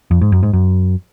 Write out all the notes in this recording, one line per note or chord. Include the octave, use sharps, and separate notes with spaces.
F2
G#2
F#2
G#2
F#2